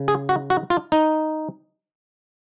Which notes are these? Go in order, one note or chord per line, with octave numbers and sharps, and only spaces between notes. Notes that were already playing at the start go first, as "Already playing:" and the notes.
Already playing: C#3
G#4
F#4
F#4
F4
D#4